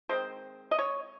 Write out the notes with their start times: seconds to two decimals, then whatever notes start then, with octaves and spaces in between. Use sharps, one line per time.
0.09 D#3 G#3 C4 C5
0.71 D#5
0.79 C#5